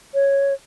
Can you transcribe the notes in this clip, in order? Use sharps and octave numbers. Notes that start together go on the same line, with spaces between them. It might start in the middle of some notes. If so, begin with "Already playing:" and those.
C#5